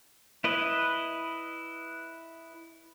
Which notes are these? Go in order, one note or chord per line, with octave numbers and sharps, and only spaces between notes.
E4 B4 D#5